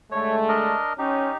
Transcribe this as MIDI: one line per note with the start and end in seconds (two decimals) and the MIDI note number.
0.12 0.77 50
0.12 0.77 56
0.12 0.77 57
0.12 0.36 73
0.49 0.93 62
0.49 0.93 70
0.49 0.93 75
0.98 1.30 61
0.98 1.37 63
0.98 1.37 67